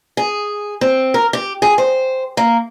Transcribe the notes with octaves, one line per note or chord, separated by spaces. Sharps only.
G#4
C4
A#4
G4
G#4
C5
A#3